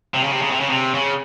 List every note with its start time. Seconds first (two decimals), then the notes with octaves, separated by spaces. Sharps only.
0.14 C3
0.24 C#3
0.32 C3
0.42 C#3
0.51 C3
0.60 C#3
0.69 C3
0.94 C#3